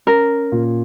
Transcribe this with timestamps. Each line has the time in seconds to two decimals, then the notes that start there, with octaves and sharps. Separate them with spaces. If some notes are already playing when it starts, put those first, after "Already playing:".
0.07 C#4 A#4
0.52 A#2